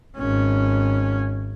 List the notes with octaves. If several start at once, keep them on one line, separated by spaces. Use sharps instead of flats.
G#1 C#4